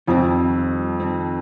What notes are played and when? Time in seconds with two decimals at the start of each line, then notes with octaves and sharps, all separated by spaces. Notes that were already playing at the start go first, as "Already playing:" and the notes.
0.07 F2 D#3 F3 G3 C4
1.00 D#3 G3 C4